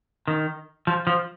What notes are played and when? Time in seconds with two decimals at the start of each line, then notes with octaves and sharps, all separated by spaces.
0.28 D#3
0.87 F3
1.07 F3